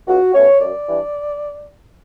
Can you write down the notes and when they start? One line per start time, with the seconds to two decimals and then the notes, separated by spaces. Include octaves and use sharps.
0.08 C#2 F#4
0.34 B2 A3 C#4 C#5
0.60 F#2 D5
0.87 E3 G3 D4